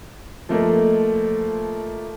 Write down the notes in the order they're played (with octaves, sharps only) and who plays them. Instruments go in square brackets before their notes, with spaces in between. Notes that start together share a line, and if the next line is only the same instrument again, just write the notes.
[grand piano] F3 A3 A#3 D#5